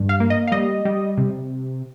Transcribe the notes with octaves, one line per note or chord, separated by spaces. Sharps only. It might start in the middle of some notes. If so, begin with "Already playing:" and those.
Already playing: G2
F5
A#3
D#5
F5
G3 D#5
G3
C3